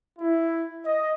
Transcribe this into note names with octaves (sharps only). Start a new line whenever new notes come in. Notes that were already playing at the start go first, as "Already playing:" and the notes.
E4
D#5